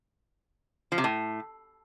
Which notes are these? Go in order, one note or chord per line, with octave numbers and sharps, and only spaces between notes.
F3
C3
A2